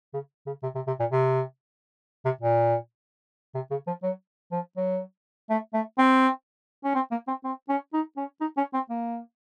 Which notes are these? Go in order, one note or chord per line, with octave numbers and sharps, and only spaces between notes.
C#3
C#3
C3
C3
C3
A#2
C3
C3
A#2
C3
C#3
F3
F#3
F3
F#3
A3
A3
C4
C#4
C4
A#3
C4
C4
C#4
D#4
C#4
D#4
C#4
C4
A#3